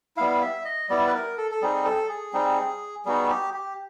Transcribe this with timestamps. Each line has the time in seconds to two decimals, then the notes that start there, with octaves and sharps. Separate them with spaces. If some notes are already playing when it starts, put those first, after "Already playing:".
0.17 G3 B3 E4 F5
0.42 E5
0.65 D#5
0.89 G3 B3 E4 D5
1.07 B4
1.14 A#4
1.38 A4
1.51 A4
1.62 G3 C4 D#4 G#4
1.85 A4
2.09 G#4
2.33 G3 C4 D#4
3.05 G3 B3 D#4 F#4 G#4
3.29 G4
3.54 G4